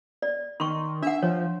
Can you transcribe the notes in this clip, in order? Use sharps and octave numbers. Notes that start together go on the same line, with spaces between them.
D5
D#3 C6 C#6
D4 E5 F#5
F3 C#5